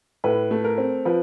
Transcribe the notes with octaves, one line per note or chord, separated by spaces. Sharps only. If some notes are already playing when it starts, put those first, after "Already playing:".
A2 B4
A3
A#4
C4
F3 B4